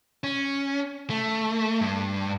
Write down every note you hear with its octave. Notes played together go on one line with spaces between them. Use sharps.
C#4
A3
G2